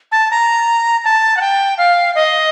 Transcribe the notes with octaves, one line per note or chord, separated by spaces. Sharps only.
A5
A#5
A5
F#5
G5
F5
D#5